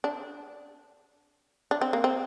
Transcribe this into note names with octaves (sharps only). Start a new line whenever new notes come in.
D4
D4
C4
A#3
C4